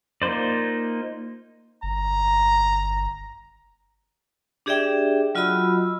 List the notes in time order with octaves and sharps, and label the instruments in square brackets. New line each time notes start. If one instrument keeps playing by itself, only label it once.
[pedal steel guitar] A#3 D#4 F4 C5 D5
[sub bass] G1 [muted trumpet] A#5
[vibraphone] D4 G4 G#4 D5 E5 G5
F#3 F4 F#4 D#5 B5 E6